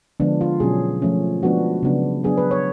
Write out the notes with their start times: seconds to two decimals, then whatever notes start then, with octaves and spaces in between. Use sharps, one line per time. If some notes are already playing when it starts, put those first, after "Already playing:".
0.20 D3 F3 G#3 B3 D4
0.41 F4
0.60 B2 F#3 C#4 G#4
1.02 F3 A3 C#4
1.43 F3 G#3 B3 D4 F#4
1.83 C#3 F#3 B3 D4
2.23 F#3 B3 D4 G#4
2.38 B4
2.51 C#5